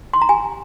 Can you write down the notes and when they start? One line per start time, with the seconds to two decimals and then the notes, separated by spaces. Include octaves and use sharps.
0.14 C6
0.22 A#5
0.29 G4 G#5